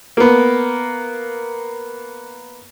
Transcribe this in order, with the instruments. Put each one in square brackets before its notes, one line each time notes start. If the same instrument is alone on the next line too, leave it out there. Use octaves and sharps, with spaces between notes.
[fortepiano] A#3 B3